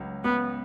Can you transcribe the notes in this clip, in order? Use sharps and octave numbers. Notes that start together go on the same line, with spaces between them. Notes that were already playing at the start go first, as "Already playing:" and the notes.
Already playing: C#2 F#3
C#2 B3